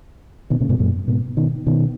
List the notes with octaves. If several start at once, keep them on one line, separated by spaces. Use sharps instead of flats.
B2 D#3
A#2 C#3
G#2 B2
F#2 A#2
G#2 B2
B2 D#3
B2 D#3